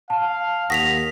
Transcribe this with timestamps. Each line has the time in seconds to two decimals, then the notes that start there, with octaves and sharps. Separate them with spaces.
0.10 F5 A5
0.70 D#2 F#5 C#6 D#6 A#6 B6 F7